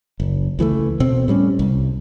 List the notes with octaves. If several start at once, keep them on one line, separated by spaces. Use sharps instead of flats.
F#1
C#2 E3 G#3 A3
B2 C4
A2 G3 C4 C#4
C2